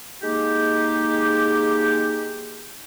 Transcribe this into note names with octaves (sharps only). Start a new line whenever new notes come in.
G#3 A#3 D#4 G4